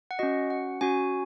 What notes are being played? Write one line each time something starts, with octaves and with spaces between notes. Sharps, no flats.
F#5
C#4 F#4 D#5
F#5
C#4 F#4 G#5